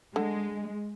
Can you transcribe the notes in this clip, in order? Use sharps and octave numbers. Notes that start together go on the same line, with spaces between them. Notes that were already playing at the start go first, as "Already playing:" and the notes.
D3 G#3